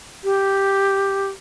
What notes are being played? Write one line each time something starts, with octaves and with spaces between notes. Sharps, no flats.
G4